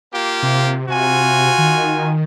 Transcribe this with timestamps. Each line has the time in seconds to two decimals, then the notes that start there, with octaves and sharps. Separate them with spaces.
0.13 A#3 F4 G4
0.43 C3
0.88 C3 F4 F#4 G#5
1.58 D#3